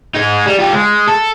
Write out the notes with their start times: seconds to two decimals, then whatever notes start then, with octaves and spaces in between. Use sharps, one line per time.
0.14 G#3 D#4
0.46 G3
0.59 F4 G4
0.73 G#3
1.08 A4